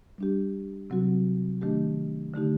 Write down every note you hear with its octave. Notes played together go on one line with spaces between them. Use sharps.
G3 D4 G4
C3 F#3 C4 F#4
D#3 A3 D4 G4
D3 A3 D#4 G4